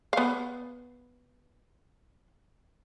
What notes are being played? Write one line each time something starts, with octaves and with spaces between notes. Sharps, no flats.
B3 F5